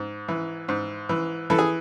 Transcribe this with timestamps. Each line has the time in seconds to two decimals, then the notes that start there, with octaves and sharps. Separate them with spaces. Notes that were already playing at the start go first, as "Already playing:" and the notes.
Already playing: G#2
0.28 E3
0.68 G#2
1.09 E3
1.50 E3 A4
1.58 G#4